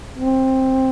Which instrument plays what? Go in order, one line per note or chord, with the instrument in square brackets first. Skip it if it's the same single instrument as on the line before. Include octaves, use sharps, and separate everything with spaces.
[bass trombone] C4